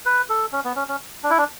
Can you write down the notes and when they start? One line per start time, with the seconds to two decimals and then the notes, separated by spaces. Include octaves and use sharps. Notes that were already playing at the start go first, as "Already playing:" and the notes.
0.05 B4
0.29 A4
0.52 C#4
0.64 B3
0.76 C#4
0.88 C#4
1.23 D4
1.30 E4
1.38 D4